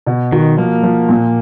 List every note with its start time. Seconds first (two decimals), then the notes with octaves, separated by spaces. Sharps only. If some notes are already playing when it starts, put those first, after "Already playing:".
0.06 B2
0.32 D#3 F#4
0.58 F3 A#3
0.83 F3
1.09 A#2